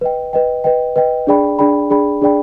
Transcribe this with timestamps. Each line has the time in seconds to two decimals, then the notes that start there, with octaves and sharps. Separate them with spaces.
0.01 B4 D#5 G5
0.33 B4 D#5 G5
0.64 B4 D#5 G5
0.96 B4 D#5 G5
1.27 D4 G#4 D5 G5 B5
1.59 D4 G#4 D5 G5 B5
1.90 D4 G#4 D5 G5 B5
2.21 D4 G#4 D5 G5 B5